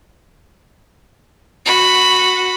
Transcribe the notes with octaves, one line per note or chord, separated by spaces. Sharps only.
F#4 B5